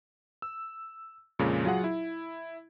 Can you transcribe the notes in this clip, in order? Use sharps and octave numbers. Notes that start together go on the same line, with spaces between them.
E6
F2 A#2 C#3 G#3
F#3 F4 G#4 F#5
E4